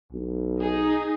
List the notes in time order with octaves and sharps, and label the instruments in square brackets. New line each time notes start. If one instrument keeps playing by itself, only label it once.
[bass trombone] B1
[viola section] D#4 [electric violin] G#4